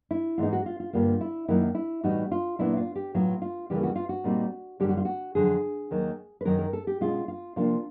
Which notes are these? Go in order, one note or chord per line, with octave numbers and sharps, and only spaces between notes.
E4
G#2 E3 G#3 B3 D#4 F4
F#4
F4
F4
G2 D3 G3 A#3 F4
E4
F#2 D#3 F#3 A#3 D#4 E4
E4
A2 E3 G3 B3 D#4 F#4
F4
A#2 F#3 B3 D4 E4
F4
G4
A2 F#3 B3 F4
F4
D#2 C#3 E3 G3 G4
F#4
F4
F#4
A#2 G3 C4 D#4
F#2 D3 G3 G4
F#4
F4
F#4
F2 D3 F#3 G#4
D#2 D#3 F#3
B4
F#2 D#3 F#3 A#4
A#4
A4
G4
B2 G#3 C#4 F4
F4
C3 F3 A#3 D4 F4